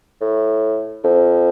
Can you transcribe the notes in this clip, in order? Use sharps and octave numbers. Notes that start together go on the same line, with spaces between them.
A2
F2